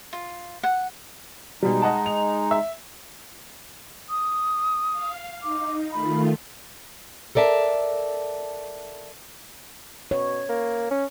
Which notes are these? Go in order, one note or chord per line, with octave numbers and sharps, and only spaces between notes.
F4
F#5
B2 G3 G#3 D#4
D#5 F#5 A5
F7
E5
D#6
F5
D#4 D6
D#3 A3 F4 B5
A4 A#4 D5 E5 A5
B2 C#5
A#3
C#4